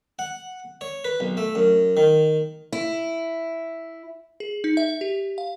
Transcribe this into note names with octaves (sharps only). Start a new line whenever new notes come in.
F#5
C#5
B4
B1
A3
F#2
D#3
E4
G#4
D#4
E5
G4
F5